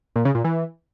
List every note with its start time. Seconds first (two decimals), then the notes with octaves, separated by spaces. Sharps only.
0.16 A#2
0.25 C#3
0.35 A#2
0.44 E3